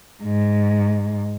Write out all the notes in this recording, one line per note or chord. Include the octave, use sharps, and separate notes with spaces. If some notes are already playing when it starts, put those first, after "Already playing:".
G#2